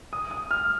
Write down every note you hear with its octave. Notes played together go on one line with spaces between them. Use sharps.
D#6
D#6
F6